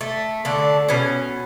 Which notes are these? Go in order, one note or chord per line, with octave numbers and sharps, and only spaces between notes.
A3
D3 A3 D4
B2 C#4